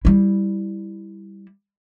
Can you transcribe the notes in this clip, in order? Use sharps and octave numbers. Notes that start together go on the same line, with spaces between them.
G3 E4